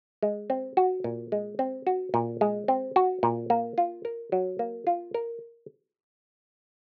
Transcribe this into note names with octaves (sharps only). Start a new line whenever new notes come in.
G#3
C4
F#4
A#2
G#3
C4
F#4
A#2
G#3
C4
F#4
A#2
A#3
F4
A#4
F#3
A#3
F4
A#4